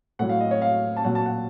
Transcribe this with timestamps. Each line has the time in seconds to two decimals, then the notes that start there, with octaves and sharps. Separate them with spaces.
0.19 A2 F#3 F#5
0.29 F5
0.40 D#5
0.51 C#5
0.62 F5
0.97 A5
1.04 A#2 F#3 F#5
1.15 A5
1.26 F#5